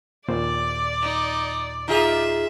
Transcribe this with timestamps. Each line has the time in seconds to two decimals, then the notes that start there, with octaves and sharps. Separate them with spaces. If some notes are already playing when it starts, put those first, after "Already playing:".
0.28 D#2 A#2 C5 D5
1.02 D#4
1.88 D#4 F4 G#4 E5